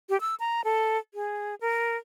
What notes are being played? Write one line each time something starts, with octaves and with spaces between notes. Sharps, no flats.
G4
E6
A#5
A4
G#4
A#4